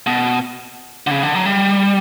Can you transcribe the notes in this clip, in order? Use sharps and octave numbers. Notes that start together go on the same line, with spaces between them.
B2
D3
C#3
D3
F#3
G3